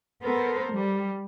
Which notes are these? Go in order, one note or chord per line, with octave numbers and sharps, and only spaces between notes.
B3 A4 A#4 C5
G3